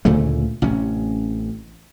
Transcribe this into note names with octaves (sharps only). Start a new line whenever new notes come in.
D2 A#2 C#3 A3
A1 C3 C#4